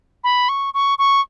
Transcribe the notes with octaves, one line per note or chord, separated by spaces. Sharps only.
B5
C#6
C#6
C#6